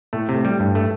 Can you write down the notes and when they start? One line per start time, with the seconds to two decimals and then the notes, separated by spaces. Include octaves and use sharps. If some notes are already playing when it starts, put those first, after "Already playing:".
0.13 A2 A3
0.29 C3
0.45 G3
0.60 G2
0.75 A3